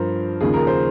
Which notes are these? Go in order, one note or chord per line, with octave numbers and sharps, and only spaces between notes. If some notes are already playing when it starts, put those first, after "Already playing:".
Already playing: G2 F3 A#4 C5
D#2 C#3 F3 G#4
A#4
C5